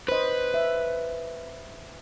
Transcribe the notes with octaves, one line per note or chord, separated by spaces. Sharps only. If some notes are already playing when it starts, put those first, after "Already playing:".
B4 C5 D#5
E5